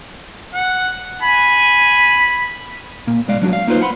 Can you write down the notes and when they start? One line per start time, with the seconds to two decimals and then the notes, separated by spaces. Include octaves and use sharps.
0.55 F#5
1.22 G#5 B5
3.07 A#2 A#3
3.28 B1 G#3 D5 F5
3.42 F#3 D4 F4 F#4
3.53 F5
3.67 A#3 D#4 F4 B4 C5
3.81 F#5 B5 C6